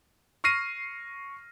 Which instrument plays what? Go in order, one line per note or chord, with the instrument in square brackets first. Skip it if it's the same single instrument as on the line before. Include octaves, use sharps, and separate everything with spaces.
[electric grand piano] C#6 F6 A#6 C7 D#7